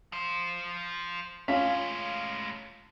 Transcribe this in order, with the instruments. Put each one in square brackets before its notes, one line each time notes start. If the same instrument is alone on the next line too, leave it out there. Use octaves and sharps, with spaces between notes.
[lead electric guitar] F3 C5
[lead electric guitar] A2 G#3 [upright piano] C#4 F4 B6